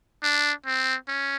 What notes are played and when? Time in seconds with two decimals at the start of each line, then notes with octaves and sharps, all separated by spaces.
0.23 D4
0.66 C4
1.08 C#4